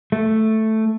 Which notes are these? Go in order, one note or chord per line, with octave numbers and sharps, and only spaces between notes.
A3